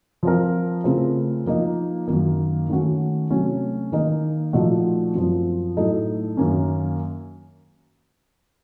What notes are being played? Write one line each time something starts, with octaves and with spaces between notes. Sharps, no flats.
F3 C4 F4 A#4
C#3 A3 C4 F4 A#4
F3 A#3 D#4
F#2 D#3 A#3
D#3 A3 C#4 F#4
C3 F#3 A3 C#4
D#3 A#3 D#4 A#4
A#2 F3 A3 D#4 F#4
F#2 F3 C4
A2 F#3 A3 D#4 A4
F#2 D#3 A#3 C#4